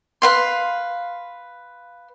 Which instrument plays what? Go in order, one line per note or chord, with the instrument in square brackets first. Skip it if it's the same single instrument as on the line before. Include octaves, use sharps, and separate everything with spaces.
[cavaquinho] B4 F5 C6